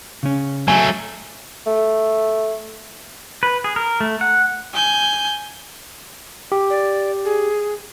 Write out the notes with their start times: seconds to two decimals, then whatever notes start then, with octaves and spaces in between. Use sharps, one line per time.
0.23 C#3 C#4
0.68 F#3 A3 G#5
1.67 A3
3.43 B4
3.64 G#4
3.76 A#4
4.00 A3
4.21 F#5
4.73 G#5 G6
6.52 G4
6.70 D5
7.25 G#4